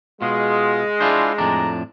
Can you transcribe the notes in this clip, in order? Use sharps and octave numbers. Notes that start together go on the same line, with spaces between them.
B2 G#3 F4
D4 E4 F4 C5
F2 A2 D4 A#5